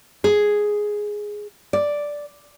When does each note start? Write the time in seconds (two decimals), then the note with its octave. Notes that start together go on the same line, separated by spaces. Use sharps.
0.24 G#4
1.73 D5